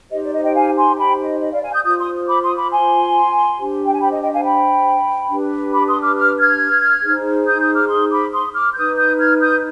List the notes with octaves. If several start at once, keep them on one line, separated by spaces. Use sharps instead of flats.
D#4 G4 C5 D#5
D5
D#5
D#5 G5
F5 G#5
G#5 C6
G5 B5
D#5
D#5
D5 F5
F5 G#5
D#6 G6
F4 C5 D#6 G6
C6 D#6
B5 D6
C6 D#6
B5 D6
G#5 C6
D4 G4 C5
G5
G#5
G5 B5
D#5
D#5 G5
F5 G#5
G5 B5
D4 G4 B4
B5 D6
C6 D#6
D6 F6
D6 F6
F6 G#6
D#4 G#4 C5
D#6 G6
D#6 G6
D6 F6
C6 D#6
B5 D6
C6 D#6
D6 F6
D#4 B4 D#6 G6
D#6 G6
F6 G#6
D#6 G6